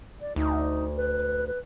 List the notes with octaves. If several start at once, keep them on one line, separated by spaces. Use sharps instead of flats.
D5
D2 D#4
B4
B4